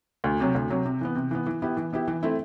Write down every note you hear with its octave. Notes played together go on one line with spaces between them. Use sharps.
D2
C3 F#3
D2
C3 F#3
C3
E3 B3
C3
E3 B3
E3
B3 E4 G4
E3
B3 E4 G4
E3
A3 C4 E4